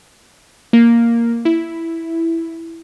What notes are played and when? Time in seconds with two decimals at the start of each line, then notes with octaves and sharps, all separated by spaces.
0.73 A#3
1.45 E4